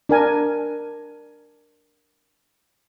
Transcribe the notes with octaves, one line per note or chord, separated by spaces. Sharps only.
D4 A#4 G#5